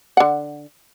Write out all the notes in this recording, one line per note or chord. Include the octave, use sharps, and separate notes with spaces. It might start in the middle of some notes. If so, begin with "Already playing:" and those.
D3 F#5